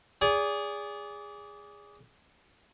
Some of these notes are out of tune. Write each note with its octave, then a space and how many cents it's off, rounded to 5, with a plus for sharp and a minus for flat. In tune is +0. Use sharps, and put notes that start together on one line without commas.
G#4 -15 D5 -30